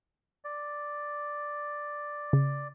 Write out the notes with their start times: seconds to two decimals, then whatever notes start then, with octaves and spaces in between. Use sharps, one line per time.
0.45 D5
2.33 C#3